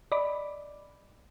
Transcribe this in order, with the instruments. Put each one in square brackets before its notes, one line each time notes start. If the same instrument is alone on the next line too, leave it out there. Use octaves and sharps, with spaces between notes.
[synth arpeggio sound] D5 D#5 B5 D6